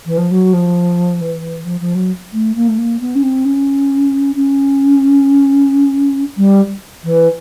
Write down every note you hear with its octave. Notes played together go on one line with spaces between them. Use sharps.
E3
F3
F#3
F3
E3
F3
F3
F#3
A3
A#3
A3
A#3
B3
C#4
C4
C#4
C#4
G3
E3